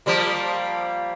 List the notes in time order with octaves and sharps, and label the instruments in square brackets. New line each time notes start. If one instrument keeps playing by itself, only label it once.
[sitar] F3 G3 A#3